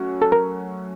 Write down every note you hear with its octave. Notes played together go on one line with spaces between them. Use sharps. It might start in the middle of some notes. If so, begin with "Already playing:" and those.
Already playing: F#3 A3 C#4 F#4
A4
A#4